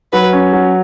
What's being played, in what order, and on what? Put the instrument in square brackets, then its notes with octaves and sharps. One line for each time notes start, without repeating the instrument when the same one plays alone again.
[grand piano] F#3 [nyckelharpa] B4
[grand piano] C#4
F#3